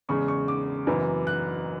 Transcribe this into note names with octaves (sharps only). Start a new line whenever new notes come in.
E2 C#3 G#3 C#6
C#6
D6
F#1 F#2 E3 B3
F#6